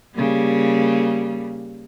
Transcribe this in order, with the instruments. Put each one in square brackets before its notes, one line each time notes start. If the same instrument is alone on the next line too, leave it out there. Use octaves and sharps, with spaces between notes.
[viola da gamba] C#3 G3 A#3